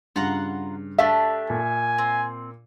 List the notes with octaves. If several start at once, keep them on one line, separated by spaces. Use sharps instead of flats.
G2 C#3 F4 F#5 A#5
A3 D4 G4 E5
A#2 G#5
C4